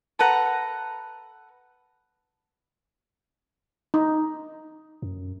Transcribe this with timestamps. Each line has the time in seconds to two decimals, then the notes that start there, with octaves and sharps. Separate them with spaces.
0.19 A4 B4 F#5 A#5
3.94 D#4
5.02 F#2